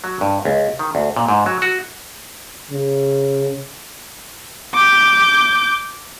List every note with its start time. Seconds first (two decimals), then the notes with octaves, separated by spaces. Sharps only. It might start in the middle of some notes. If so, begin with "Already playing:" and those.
0.04 F#3
0.21 G2
0.45 C#2
0.79 D#3
0.95 D2
1.16 A#2
1.29 G#2
1.46 F#3
1.62 F#4
2.71 C#3
4.74 D6 G6